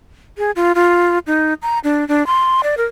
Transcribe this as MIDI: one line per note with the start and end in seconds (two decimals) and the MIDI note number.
0.38 0.51 68
0.56 0.72 65
0.75 1.19 65
1.27 1.54 63
1.62 1.79 82
1.84 2.07 62
2.08 2.25 62
2.27 2.61 84
2.63 2.75 74
2.77 2.85 70